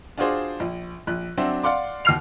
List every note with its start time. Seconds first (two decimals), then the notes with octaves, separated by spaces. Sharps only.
0.18 D4 F4 F#4 G#4 C5 D5
0.60 A#1
1.07 A#1 F#6
1.37 F#3 C4 D4 F#4 C5 E5
1.63 D5 F5 F#5 C6 D6
2.05 D#2 F#4 F6 C7 F7